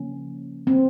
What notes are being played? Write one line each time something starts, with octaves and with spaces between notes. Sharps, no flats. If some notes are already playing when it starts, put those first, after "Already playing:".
Already playing: C#3 F3 A#3 C#4
C4